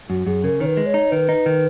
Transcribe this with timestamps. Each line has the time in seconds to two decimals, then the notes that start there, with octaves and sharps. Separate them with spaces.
0.10 F#2 F#4
0.27 F#2 G#4
0.44 C#3 A#4
0.60 D#3 C#5
0.66 B4
0.77 G#3
0.86 C#5
0.94 D#4
1.11 D#3 B4
1.29 D#4
1.46 D#3